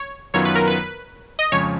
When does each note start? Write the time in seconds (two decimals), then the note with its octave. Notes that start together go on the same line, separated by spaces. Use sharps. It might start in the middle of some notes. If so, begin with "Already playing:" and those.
Already playing: C#5
0.34 F#2 D#3 F#3 B3 F4 C#5
0.45 B4
0.55 A#4
0.67 B4
1.39 D#5
1.52 F2 C#3 F3 G#3 C#5